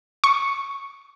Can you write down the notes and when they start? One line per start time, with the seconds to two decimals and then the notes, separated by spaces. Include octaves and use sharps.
0.24 C#6